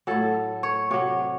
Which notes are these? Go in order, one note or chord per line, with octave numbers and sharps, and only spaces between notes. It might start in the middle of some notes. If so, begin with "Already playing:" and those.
A2 F#3 A4
C#5
C3 F#3 C#5